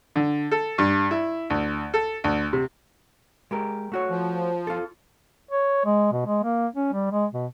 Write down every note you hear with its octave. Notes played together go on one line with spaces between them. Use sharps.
D3
A4
G2
E4
D2
A4
D2
C3
G#3 G4 A#4
A3 F#4 C#5
F3
F4 A4
C#5
G#3
B2
G#3
A#3
C#4
G3
G#3
B2